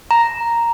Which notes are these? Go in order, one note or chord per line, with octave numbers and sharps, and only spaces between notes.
A#5